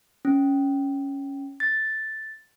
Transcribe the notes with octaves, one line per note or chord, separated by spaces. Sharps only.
C#4
A6